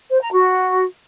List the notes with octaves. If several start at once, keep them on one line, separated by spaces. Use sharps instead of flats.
C5
A#5
F#4